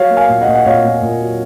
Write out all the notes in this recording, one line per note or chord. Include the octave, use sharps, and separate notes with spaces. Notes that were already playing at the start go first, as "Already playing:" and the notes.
Already playing: F#3 C#5 F5
A#3
F5 G#5
A#2
D#5 F#5
A#2
F#5
A#2 C#5 F5
A#2
A#2
F#3